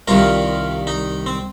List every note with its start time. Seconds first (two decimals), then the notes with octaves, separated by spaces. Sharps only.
0.08 C2 C3 D#3 G3 F4 A#4
0.87 D#4
1.26 C4